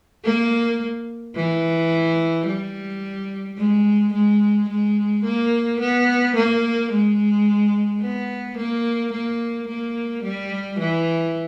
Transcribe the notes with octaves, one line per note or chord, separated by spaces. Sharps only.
A#3
E3
G3
G#3
G#3
G#3
A#3
B3
A#3
G#3
B3
A#3
A#3
A#3
G3
E3